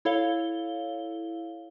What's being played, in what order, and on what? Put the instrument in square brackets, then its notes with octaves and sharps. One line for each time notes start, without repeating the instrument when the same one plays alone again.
[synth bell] E4 A4 C#5 F5 G7